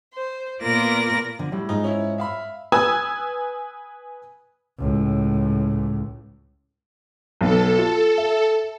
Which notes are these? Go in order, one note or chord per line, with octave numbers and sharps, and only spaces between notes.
C5
A#2 B3 F4 A#4 D5 A#6
D3 F3
A2 G3
G#2 D#4 F4
C#4 E4
E5 F5 B5
B4 G#5 D#6 E6 G#6
C#2 A2
B1 B3 A4
F4
E5